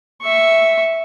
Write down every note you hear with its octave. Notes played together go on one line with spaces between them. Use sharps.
E5 C#6